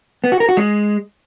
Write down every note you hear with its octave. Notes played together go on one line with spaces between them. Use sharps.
B3
F#4
A#4
F#4
G#3